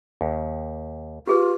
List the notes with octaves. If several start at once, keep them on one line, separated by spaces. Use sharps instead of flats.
D#2
F4 G4 G#4 B4